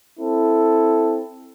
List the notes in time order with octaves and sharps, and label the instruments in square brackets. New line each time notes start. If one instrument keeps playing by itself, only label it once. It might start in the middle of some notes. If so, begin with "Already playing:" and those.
[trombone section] C4 E4 A4